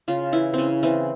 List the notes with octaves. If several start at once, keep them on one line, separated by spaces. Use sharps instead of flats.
C#3 F4
E3 E4
C#3 C4 C#4
E3 C4